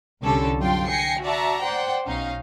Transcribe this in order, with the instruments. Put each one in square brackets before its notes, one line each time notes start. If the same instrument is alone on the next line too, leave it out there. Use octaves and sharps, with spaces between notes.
[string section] C2 D3 G3 C#4 A4
F#2 F4 G5 C6
G5 G#5 A#6 C7 C#7
F#4 D5 E5 A5 A#5
C5 D5 F#5 G5
B1 C#4 D#4 F5